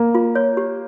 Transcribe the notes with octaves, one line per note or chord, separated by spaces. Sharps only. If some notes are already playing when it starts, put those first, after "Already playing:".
Already playing: A#3
F4
C#5
G4